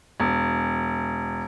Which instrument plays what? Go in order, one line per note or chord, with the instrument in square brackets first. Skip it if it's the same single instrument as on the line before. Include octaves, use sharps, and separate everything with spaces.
[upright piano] E1